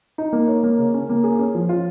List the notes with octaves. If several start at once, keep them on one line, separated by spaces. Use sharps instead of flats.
D#4
A#3
C#5
A#3
C#3
C#4
A#3
G#4
C#4
F3
F4